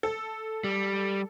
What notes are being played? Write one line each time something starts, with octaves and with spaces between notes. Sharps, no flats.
A4
G3